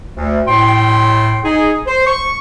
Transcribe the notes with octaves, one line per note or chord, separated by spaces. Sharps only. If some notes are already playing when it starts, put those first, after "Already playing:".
D2
A2 G5 C6
D#4 G#4
C5
C#6